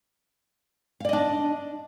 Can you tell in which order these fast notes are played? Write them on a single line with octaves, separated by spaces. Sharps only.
F5 D5 D#5 D4